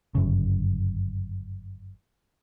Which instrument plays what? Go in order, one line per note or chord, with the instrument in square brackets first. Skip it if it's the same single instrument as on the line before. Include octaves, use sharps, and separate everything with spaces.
[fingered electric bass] G1 F#2 C#3